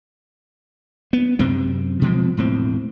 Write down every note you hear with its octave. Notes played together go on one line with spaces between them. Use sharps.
B3
F#2 C3 C4
B2 F3 G#3 C4
E1 A2 C4